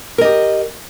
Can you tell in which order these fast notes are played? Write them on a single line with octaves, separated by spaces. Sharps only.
A#4 D#5 G4